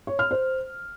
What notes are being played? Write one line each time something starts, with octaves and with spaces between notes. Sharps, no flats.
C#5
F6
C5